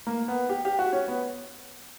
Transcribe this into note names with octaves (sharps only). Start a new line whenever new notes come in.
A#3
B3
G4
G4
F#4
C#4
B3